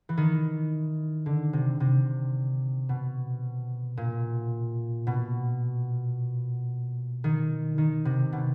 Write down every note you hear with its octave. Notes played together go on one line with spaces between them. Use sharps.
E3
D#3
D3
C3
C3
B2
A#2
B2
D#3
D#3
C3
B2